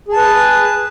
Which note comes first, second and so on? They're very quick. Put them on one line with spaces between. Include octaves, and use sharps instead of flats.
G#4 A5 B4